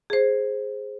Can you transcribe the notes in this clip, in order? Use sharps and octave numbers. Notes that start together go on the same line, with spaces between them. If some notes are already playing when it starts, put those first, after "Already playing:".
G#4 C5